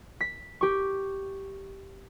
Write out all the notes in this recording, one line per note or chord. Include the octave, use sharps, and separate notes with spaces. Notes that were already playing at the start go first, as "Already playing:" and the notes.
B6
G4 C#6